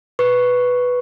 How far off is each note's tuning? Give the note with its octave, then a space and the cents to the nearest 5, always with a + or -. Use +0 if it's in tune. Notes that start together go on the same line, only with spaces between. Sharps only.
B4 +0 C#6 +0